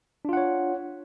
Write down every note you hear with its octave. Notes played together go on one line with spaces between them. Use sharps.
D4 F4 C#5 F#5